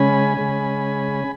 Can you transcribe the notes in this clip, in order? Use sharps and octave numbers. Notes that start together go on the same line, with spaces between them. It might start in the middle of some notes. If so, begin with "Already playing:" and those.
Already playing: C#3 G#3 C#4 G#5 B5
C#3 G#3 C#4